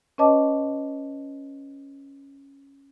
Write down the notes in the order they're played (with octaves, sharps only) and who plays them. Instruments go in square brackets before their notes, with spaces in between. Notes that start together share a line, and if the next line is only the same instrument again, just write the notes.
[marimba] C#4 B4 C#5 D#5 A5 D6